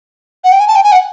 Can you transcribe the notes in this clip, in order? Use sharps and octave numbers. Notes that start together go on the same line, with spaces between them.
F#5
G5
G#5
A5
G5
G#5
F#5